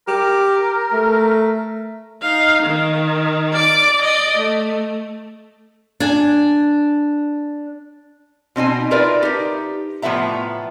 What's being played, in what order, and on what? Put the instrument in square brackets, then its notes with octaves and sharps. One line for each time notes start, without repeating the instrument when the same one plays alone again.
[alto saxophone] G4 [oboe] A#4
[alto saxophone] A3
[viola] D#4 F5
D#3
D5 D6
D5 D#5
A3
[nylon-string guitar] D4 G#5
[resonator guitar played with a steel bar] B2 C4 D#4 G#5
D#4 F4 A#4 B4 D5 E5
D#4 G4
A2 F3 B3 E5 A#5